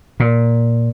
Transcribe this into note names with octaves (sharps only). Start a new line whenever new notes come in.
A#2